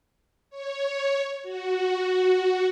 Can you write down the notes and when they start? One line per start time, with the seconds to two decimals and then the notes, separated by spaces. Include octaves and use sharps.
0.50 C#5
1.43 F#4